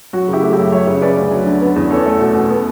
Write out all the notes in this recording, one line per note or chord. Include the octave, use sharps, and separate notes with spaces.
F#3 F#4
C#3 E4 G4
A3
F#2 E4 G4
F#3 C#5 E5
C#3
C#4 B4 D5
D2
F#3
D3
B3
E2
C#4 A4 C#5
A3
B2
B2
B3